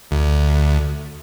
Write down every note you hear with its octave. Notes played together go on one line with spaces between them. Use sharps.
D2